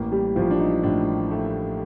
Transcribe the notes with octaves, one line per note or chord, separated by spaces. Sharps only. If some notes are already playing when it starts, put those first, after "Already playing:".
Already playing: A1 A#3 A#4
G3 G4
A1 F3 F4
D4
D#4
A2 D4
A3